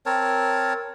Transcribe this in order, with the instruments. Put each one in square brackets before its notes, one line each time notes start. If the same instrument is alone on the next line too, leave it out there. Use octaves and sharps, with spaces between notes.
[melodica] C4 A#4 C#5 A5